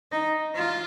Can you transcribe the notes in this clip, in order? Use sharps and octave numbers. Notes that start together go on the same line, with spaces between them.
D#4
F4